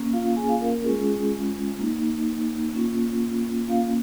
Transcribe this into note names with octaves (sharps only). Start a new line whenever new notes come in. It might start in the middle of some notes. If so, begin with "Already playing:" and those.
Already playing: A#3 C#4
F4 F5
G#4 G#5
F4 F5
A#4
A#4
G#3 C#4 F4 G#4
A#3 D#4
A#3 C#4 F4
A#3 C#4 F4 F5